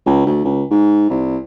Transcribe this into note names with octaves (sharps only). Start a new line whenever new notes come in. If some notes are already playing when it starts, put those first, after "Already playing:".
C#2
D2
C#2
G#2
C2